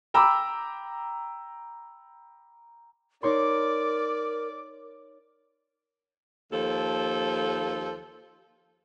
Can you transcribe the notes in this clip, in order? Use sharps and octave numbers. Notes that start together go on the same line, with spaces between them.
G5 A#5 B5 D6 E6
D#4 A#4 C#5 D5 C6 D6
D#2 F3 A4